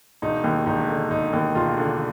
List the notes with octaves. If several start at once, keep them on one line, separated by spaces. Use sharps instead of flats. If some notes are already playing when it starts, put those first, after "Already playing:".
E1 D#4
D#2
E1 D#4
D3
E1 D#4
D#2
E1 F4
D3